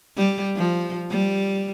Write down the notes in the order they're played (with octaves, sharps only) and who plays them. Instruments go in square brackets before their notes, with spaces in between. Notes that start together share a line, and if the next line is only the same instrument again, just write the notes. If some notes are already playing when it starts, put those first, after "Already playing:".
[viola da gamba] G3
F3
G3